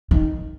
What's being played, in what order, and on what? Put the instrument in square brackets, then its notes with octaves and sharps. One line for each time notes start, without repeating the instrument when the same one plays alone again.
[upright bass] D#3